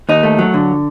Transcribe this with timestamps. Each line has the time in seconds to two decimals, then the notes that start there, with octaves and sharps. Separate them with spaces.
0.09 D#2 D#4
0.23 A3
0.39 F#3
0.54 D3